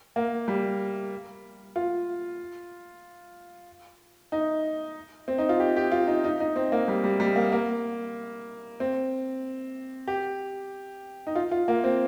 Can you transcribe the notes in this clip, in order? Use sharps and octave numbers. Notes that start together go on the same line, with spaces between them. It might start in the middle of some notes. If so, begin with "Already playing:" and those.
A#3
G3
F4
D#4
C4
D#4
F4
G4
G4
F4
D#4
D#4
D#4
C4
A#3
G3
G3
G3
A#3
A#3
C4
G4
D#4
F4
F4
A#3
C4